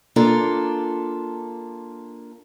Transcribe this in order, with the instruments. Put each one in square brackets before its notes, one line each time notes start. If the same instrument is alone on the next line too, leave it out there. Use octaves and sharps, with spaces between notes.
[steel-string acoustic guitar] A#3 D4 F4 A4